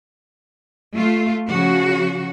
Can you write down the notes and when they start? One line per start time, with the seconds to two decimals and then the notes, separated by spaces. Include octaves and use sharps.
0.94 A3 F4
1.48 C#3 F3 F#4